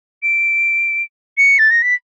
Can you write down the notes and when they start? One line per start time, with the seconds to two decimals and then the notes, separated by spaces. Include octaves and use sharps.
0.23 D7
1.38 C#7
1.59 A6
1.71 A#6
1.82 B6